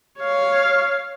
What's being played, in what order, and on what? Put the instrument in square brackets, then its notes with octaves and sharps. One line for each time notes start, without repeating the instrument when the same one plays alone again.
[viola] C#5 F5